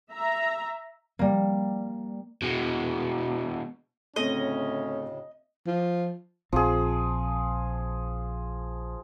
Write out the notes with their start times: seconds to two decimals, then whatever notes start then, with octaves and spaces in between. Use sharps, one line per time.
0.12 E5 A#5
1.19 G3 A#3
2.42 B2 G#3
4.16 D2 A2 C#3 A3 C4 C#4 D#5
5.67 F3
6.52 A#1 F3 C4 G#4